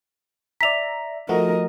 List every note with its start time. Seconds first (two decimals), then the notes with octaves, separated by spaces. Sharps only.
0.61 D5 E5 A#5 B6 F7
1.29 F3 A3 F#4 A#4 D#5